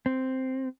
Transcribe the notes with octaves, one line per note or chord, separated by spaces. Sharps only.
C4